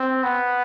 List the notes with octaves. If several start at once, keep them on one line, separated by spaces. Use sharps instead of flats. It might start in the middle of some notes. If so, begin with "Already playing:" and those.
Already playing: C4
B3